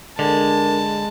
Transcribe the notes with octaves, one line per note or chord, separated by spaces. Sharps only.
D3 G#3 D4 A#4 A5